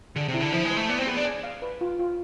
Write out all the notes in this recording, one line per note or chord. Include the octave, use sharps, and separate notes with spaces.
D3 G#4
C3
E4
D3
F3 E4
G#3
C5
A3
B3 D5
C4
B3 G#4
D4
G#5
F5
B4
F4
F4